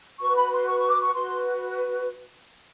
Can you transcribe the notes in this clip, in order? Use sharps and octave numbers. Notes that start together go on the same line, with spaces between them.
F#4 B4 C#6
B5
C6
C#6
C#6
D6
C#6
F#4 B4 C6